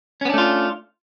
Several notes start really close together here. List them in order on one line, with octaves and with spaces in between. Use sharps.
C#4 B3 D4 A3 F4